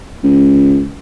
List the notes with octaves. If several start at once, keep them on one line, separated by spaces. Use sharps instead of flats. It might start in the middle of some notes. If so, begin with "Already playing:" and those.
C#2